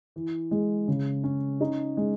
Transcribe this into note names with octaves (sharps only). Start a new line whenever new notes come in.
E3
G#3
C#3
C#4
D#4
G#3